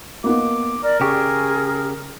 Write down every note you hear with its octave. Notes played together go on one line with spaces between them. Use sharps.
A#3 B3 D#4 D6
A#4 D5
C#3 G4 G#4 C#6